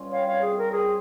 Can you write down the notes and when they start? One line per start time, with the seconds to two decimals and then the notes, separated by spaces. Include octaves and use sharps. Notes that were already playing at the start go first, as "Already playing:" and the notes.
Already playing: G2 C#4 F4
0.10 G3 C#5 F5
0.27 C3 C#5 F5
0.42 G#4
0.51 C3
0.57 A#4
0.72 C4 G#4